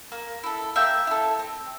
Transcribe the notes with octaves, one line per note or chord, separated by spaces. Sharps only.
A#3
E4 A4
A#3 E5 G5
E4 A4
C4